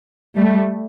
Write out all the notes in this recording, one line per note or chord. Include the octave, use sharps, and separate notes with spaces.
G3 A3